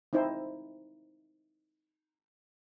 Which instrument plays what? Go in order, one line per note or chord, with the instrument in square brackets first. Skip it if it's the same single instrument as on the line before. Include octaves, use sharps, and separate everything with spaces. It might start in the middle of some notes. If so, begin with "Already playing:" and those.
[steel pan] C4 D#4 E4 C5